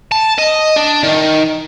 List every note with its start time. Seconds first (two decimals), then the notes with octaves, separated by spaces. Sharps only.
0.12 A5
0.38 D#5
0.76 D4
1.03 D#3